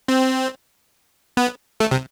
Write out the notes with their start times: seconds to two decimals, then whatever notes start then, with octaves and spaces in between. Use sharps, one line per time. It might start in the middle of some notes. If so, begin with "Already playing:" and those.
0.08 C4
1.37 B3
1.80 A3
1.91 C3